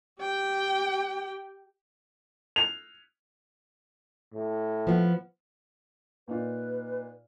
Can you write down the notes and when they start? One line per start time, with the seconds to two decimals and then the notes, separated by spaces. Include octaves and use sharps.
0.21 G4 G5
2.56 F7
4.34 A2
4.87 F3 B3
6.28 A#2 D#4 F4 B4